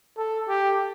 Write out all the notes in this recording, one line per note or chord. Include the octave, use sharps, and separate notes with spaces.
A4
G4